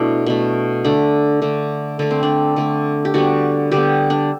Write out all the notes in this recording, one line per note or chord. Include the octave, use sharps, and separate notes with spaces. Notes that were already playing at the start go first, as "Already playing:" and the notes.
Already playing: B2 A3 D4 E4
B2 A3
D3 A3 D4
D3 A3
D3 A3 D4
C4
D4
D3 A3
G4
D3 G3 B3 F#4
D3 G3 B3 G4
D4